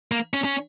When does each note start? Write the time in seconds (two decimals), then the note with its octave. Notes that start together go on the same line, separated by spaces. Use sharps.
0.12 A#3
0.34 C#4
0.45 C#4